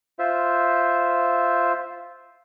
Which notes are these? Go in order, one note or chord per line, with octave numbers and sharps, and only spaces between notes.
F4 C5 E5